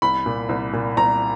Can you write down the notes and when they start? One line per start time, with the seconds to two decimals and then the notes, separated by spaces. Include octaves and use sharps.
0.02 C2 B5
0.26 A#2
0.49 C2
0.73 A#2
0.97 C2 A#5